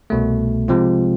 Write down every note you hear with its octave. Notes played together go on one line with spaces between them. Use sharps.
C2 B2 A3
C3 F3 G#3 C4 F4